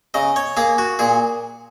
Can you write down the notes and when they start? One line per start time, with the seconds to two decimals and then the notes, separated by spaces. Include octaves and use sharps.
0.14 C#3 D#5
0.36 C#5
0.57 A#3 G#4
0.78 F#4
0.99 A#2 G#4